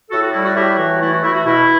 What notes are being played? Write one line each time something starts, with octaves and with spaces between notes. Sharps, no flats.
A2 F#4 A4
F#4
G3 E4
F#4
A2 E4 G4
E3 F#4
A3 E4
F#4
A3 E4
F#4
B2 E4